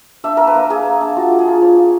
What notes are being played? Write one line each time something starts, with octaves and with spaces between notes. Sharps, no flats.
D4 E5
A#3 A#4
B4
A#3
A#3 G#4
A#3
D4
F4 F#4
F4
G#4
F4
C4 C#5
F4